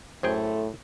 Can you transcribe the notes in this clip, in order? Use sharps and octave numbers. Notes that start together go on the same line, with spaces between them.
F#2 A2 A3 G#4 C5 G5